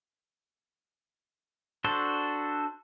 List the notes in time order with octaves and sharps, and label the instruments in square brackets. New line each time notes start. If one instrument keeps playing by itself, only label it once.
[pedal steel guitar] D4 F#4 A4 C5